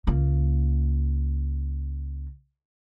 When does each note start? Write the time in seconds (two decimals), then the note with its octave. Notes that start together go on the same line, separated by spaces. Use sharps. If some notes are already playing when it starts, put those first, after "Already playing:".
0.07 C#2 A#3